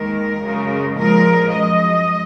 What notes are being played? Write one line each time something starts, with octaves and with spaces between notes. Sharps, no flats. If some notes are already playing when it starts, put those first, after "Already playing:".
Already playing: D#2 D#3 G#3 A#4
F#2 C#3 G#3
A#2 F3 G#3 A#4
F#2 F3 G#3 D#5